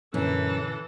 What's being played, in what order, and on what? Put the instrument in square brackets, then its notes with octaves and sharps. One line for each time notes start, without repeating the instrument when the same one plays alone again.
[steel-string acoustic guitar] F#2 [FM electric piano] A#2 D3 [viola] E3 A4